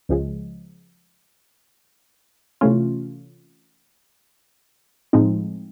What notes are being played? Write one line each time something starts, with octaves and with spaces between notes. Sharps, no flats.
C#2 C#3 F3 G#3
C3 E3 A3 C#4 F4
A2 F3 G#3 C4 D#4